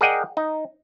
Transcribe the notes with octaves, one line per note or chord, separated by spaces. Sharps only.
G#4 A#4 D5 D#5 F#5 G5
D#4